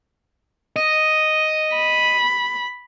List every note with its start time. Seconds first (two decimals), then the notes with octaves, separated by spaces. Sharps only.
0.76 D#5
1.76 B5